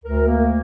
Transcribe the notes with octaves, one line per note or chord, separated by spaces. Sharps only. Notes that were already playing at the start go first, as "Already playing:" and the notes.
D2 A#4
A#3